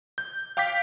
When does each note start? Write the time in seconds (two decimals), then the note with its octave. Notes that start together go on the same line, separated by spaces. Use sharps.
0.18 G6
0.57 F5 G5 D6 G6 B6